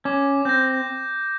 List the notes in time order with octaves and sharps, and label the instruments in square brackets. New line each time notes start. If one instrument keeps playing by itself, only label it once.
[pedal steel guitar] C#4 [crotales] D6
[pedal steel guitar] C4 [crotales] G6 A#6